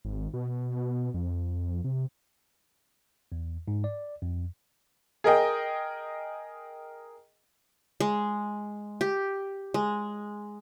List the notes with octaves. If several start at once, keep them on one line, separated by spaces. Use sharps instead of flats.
G#1
B2
B2
F2
C3
E2
G#2
D5
F2
G#4 A#4 D#5 G5
G#3
G4
G#3